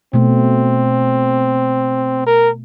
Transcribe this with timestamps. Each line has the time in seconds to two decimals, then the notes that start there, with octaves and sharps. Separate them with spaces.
0.13 B2 A3 C4
2.26 A#4